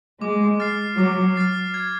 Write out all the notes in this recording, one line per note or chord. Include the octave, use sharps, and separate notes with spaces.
G#3 D6
F6 A6 C7
F#3 D6
F6 A6 C7
G#6